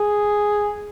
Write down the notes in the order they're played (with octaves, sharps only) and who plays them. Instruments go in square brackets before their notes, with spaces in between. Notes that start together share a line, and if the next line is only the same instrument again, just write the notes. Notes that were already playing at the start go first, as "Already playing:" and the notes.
Already playing: [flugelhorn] G#4